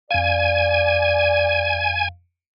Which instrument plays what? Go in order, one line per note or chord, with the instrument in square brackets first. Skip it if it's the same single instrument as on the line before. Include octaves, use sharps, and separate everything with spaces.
[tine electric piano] F2 F5 [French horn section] D5 [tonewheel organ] G#5